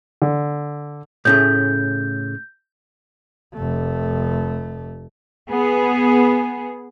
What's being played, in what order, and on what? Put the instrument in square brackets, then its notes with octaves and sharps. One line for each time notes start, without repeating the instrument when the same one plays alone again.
[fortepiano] D3
[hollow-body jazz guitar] A2 C#3 A3 [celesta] G6
[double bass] F1 A3
[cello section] B3 G#4